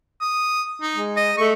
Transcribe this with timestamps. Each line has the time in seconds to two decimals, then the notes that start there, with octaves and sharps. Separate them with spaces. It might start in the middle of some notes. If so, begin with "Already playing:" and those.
0.21 D#6
0.82 D#4
0.95 G#3
1.17 D#5
1.38 A3 C#6